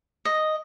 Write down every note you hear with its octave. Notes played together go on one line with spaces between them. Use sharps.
D#5